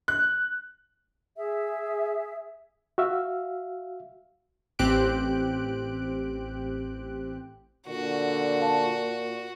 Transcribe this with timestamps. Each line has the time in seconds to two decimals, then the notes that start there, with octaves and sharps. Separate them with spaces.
0.08 F#6
1.36 G#4 E5
2.98 F#4 E5 F5
4.79 A1 C4 G4 F#6 D7
7.88 A#2 D3 F#4
8.60 F5 A5